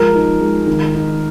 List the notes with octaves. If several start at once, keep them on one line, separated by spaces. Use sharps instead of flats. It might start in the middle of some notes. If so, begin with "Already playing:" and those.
Already playing: F3 G#3 A#4
D#4
G#3
D#3
D#4